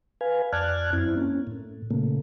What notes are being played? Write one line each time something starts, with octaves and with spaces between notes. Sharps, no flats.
B4 F5 G#5
F2 D5 A5 F6 F#6 G#6
F#2 C4 E4
A#3 C#4
A2
A#2 C#3 A3 A#3